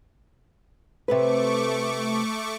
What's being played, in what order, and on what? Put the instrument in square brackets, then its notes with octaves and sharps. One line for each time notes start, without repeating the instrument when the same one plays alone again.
[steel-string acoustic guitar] C3 C4 B4 [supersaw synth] A3 C#6 D6